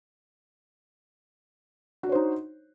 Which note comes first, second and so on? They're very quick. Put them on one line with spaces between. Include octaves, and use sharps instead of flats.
F#4 D4 C#5 C5 D#4